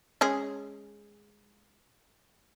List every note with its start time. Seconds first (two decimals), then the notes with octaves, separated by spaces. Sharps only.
0.21 G#3 C#4 G#4